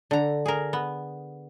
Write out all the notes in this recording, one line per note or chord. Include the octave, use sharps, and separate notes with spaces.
D3 A#5
G#4 A#4
B3